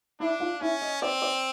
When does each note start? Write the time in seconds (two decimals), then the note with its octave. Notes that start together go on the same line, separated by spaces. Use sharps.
0.20 D4 E4 E5
0.40 F4 F5
0.61 C#4 E4 E5
0.82 D#5
1.02 C4 D5
1.22 D5